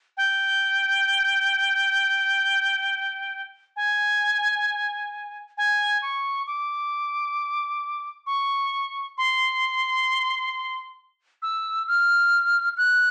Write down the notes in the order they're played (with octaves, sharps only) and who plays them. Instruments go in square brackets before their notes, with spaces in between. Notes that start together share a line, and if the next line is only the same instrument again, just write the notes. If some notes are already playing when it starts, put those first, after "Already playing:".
[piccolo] G5
G#5
G#5
C#6
D6
C#6
C6
E6
F6
F#6